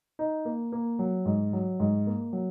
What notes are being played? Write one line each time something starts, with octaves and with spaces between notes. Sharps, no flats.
D#4
A#3
A#3
F#3
G#2
F#3
G#2
A#3
F#3